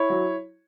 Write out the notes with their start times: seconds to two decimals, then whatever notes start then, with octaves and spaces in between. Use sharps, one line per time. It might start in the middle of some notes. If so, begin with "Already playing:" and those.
Already playing: E4 C#5
0.10 F#3